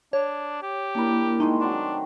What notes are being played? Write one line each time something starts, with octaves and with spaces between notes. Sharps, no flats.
D4 C#5
G4
A#3 D4 E4 A#4 B5
D#3 G#3 A3 D#4
F#3 C4 D4 G5